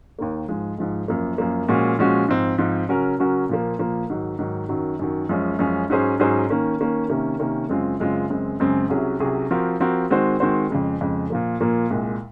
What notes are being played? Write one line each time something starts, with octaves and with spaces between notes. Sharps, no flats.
D#2 D#3 A#3
G#2 F3 G#3
G#2 F3 G#3
F#2 F3 A#3
F#2 F3 A#3
A#2 F3 G#3 C#4 F#4
A#2 F3 G#3 C#4 F#4
G#2 F3 C4
G#2 F3 C4
C#3 F#3 C#4 F#4 A#4
C#3 F#3 C#4 F#4 A#4
A#2 F3 A#3
A#2 F3 A#3
G#2 D#3 F#3
G#2 D#3 F#3
F#2 D#3 F#3
F#2 D#3 F#3
F#2 F3 G#3 C#4
F#2 F3 G#3 C#4
G#2 F#3 C#4 G#4 C5
G#2 F#3 C#4 G#4 C5
D#3 A#3 C#4
D#3 A#3 C#4
C3 D#3 A#3 C#4
C3 D#3 A#3 C#4
F#2 C#3 G#3 C4 F4
F#2 C#3 G#3 C4 F4
F#2 C#3 G#3 C4
F#2 C#3 G#3 C4
C2 C3 F#3 C#4 G#4
C2 C3 F#3 C#4 G#4
F3 C4 F#4 A#4
F3 C4 F#4 A#4
D#3 G#3 C4 F#4 C5
D#3 G#3 C4 F#4 C5
F2 C#3 G#3
F2 C#3 G#3
A#2 F3 A#3
A#2 F3 A#3
C2 A#2 G#3